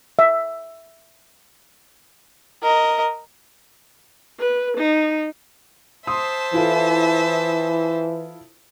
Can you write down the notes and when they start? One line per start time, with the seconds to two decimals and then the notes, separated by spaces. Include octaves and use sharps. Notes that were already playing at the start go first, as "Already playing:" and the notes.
0.19 E5
2.63 A#4 D#5
4.39 B4
4.77 D#4
6.07 C5 E5 A5 C6 D#6
6.54 E3 E4 F4 A4